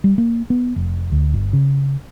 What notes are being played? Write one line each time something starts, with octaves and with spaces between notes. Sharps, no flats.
G3
A#3
B3
F1
D2
G1
C#3